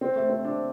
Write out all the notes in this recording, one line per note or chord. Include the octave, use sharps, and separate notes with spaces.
C4
A3
C4
D4